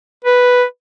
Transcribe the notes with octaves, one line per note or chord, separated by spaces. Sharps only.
B4